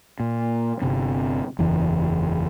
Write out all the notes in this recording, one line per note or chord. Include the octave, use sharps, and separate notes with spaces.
A#2
G1 C3 C4
F#1 E2 E3